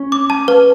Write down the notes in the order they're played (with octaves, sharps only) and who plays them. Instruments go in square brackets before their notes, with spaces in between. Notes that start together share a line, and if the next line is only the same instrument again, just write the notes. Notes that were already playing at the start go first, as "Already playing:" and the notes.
Already playing: [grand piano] C#4
[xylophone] D6
A5
B4